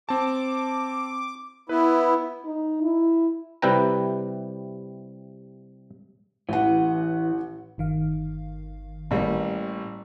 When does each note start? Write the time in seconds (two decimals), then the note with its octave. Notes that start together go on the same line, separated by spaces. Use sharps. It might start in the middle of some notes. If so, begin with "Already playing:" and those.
0.09 C4 A5 D6
1.69 B3 E4 B4
2.45 D#4
2.83 E4
3.62 C3 G3 E4 B4 G5 A#5
6.49 A1 E3 F#5
7.78 G1 D#3 F5
9.11 A1 G3 A#3